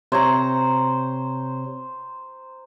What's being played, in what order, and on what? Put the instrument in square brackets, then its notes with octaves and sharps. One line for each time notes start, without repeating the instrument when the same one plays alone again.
[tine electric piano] C3 C#5 [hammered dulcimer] C5 A#5